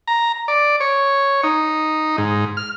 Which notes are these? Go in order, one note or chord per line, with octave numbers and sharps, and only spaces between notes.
A#5
D5
C#5
D#4
G#2
F6